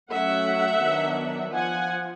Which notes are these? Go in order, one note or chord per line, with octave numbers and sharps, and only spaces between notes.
F#3 A3 C#4 E5 F#5
D#3 F#3 B3 D4
F3 F#5 G#5